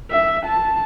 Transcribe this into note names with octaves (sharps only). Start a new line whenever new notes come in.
E5
A5